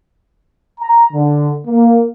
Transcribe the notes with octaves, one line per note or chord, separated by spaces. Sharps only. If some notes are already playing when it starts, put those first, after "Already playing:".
A#5
D3
A#3